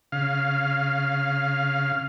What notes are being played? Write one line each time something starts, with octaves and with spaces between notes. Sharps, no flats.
C#3 F5